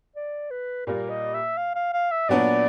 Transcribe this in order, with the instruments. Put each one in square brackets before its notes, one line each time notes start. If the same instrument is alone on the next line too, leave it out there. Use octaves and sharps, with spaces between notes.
[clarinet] D5
B4
[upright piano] A#2 G3 A#3 [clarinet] A#4
[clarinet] D#5
E5
F5
F5
F5
E5
[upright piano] A#2 F#3 B3 D4 [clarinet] D5